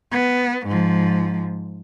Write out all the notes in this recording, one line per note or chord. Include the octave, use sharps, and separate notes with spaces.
B3
G#2 F3